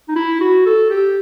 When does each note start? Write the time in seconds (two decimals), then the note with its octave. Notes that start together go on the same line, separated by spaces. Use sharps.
0.09 D#4
0.16 E4
0.41 F#4
0.66 A4
0.91 G4